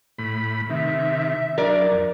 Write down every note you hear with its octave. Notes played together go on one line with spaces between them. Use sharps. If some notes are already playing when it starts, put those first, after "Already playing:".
A2 B5
C3 D#3 E5
F#3 D4 A#4 D5
F2